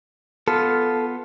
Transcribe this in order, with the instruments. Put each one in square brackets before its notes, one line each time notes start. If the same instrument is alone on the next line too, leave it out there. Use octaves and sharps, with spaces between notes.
[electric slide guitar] B3 F4 [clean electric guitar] A4